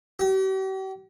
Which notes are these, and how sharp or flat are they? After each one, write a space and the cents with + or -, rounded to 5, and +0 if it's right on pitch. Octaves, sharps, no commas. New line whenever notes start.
G4 -45